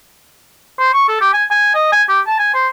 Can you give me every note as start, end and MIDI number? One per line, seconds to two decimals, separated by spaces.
0.79 0.90 72
0.93 1.06 85
1.08 1.19 69
1.21 1.28 67
1.33 1.44 80
1.51 1.71 80
1.75 1.88 75
1.92 2.03 80
2.09 2.20 67
2.27 2.36 81
2.39 2.50 80
2.54 2.68 72